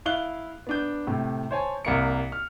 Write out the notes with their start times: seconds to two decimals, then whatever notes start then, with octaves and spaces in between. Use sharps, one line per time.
0.05 E4 F5 F#6 G7
0.67 B3 D4 G6
1.07 A2 C3 A3
1.51 C5 C#5 G#5 A5
1.85 C2 A#3 C#7
2.32 F6